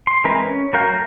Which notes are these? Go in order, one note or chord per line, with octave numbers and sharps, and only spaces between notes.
C6
E3 G#3 C4 A#4 B4
C#4
F#3 F#4 A#4 F5 G5
A3 A#4 A#5